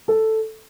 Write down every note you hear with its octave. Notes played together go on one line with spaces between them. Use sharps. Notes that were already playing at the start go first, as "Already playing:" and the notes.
A4